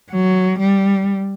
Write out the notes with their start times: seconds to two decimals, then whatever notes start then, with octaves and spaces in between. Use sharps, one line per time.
0.11 F#3
0.59 G3